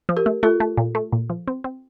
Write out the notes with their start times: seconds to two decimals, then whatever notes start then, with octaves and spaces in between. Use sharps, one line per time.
0.09 F3
0.17 G4 A#4
0.26 A3
0.43 A3 F4 A4
0.60 A3
0.77 A#2
0.95 A3
1.12 A#2
1.30 F3
1.47 C4
1.64 C4